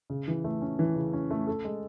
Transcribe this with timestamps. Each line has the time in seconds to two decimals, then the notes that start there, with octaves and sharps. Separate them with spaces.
0.10 C#3
0.28 E3
0.44 A3
0.62 C#4
0.79 E3
0.96 C#3
1.13 C#4
1.31 A3
1.47 A4
1.64 G#3